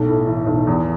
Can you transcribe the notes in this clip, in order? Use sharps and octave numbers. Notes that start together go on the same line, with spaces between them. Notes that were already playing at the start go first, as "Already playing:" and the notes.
Already playing: B1 A3
A2
E3
B1
E2